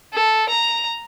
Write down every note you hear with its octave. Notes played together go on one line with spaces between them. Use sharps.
A4
A#5